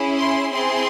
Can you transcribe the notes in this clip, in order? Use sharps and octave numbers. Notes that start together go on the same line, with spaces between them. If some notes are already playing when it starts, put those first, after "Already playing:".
Already playing: C#4 E4 G#4
C6
C4 E4 G#4 C6